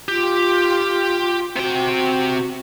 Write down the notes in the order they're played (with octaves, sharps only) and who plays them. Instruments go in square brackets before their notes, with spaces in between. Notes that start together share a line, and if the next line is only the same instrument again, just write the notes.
[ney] F4 [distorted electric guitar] G4
[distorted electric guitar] C3 G5 [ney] F#4